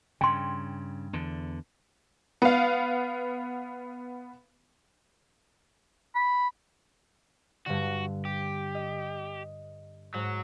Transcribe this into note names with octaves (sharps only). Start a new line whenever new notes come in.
G2 C#3 G5 C6
E2 D3
B3 F5
B5
G2 D3 F#4
G4
D#5
G#2 F#3